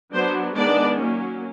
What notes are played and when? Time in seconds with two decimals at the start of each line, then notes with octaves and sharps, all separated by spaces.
0.13 F#3 B3 D4 C5
0.56 D#3 G#3 B3 D4 D5
0.99 F#3 A#3 C#4